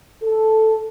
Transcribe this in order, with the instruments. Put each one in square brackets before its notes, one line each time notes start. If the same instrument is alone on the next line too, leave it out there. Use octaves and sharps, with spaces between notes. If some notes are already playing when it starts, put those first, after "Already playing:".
[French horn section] A4